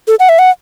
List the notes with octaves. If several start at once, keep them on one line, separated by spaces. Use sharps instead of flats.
A4
F#5
E5
F#5